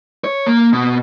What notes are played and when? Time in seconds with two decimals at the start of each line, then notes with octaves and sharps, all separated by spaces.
0.24 C#5
0.46 A#3
0.73 B2